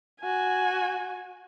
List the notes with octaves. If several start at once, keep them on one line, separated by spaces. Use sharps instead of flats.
F#4 G#5